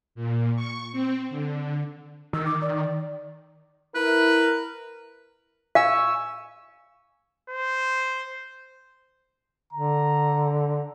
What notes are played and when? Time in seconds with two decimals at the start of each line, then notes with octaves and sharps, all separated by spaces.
0.15 A#2
0.56 C#6
0.92 C4
1.30 D3
2.33 D#3 E6
2.45 D6
2.61 D5
3.95 E4 A#4 B4
5.75 F5 G#5 C#6 E6
7.50 C5
9.73 D3 A#5